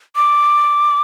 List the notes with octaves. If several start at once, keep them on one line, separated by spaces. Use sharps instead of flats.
D6